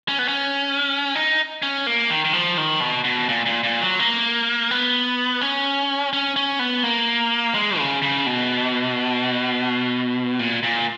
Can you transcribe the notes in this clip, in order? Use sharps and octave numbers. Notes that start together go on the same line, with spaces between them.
C#4
B3
C#4
D#4
C#4
A#3
D#3
D#3
F3
D#3
B2
B2
A#2
A#2
A#2
F#3
A#3
B3
C#4
C#4
C#4
B3
A#3
G#3
C#3
C#3
B2
A#2
A#2